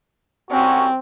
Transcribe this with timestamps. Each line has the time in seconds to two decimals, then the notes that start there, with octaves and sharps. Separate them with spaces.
0.51 C2 C4 C#4 F#4